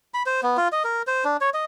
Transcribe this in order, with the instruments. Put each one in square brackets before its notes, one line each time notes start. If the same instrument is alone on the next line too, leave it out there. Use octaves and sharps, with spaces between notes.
[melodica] B5
C5
B3
F4
D#5
A#4
C5
D4
C#5
D#5